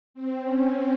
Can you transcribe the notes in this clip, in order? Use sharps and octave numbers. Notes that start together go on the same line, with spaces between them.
C4
C#4